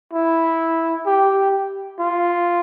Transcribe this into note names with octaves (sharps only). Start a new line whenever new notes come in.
E4
G4
F4